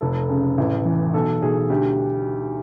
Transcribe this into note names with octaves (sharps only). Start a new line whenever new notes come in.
F1 A4
C#3
A1
E3
B1 A4
B1 G#4
D2 G4